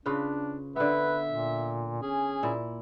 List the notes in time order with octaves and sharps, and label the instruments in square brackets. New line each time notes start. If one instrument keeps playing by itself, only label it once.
[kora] C#3 F4 B4 [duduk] D4
[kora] D3 B3 [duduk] B4 [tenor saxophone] E5
[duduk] A#2
[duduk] C#4 [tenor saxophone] G#4
[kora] A#2 E4